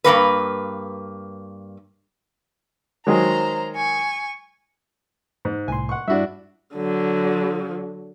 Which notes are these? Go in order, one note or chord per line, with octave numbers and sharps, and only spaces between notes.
G2 D#3 A#3 B4
D#3 F#3 G#3 C5 A#5
G#5 C#6
G#2
C2 A2 G#5 C6
F#5 C#6
G2 D4 E4 F#4 E5
D3 F#3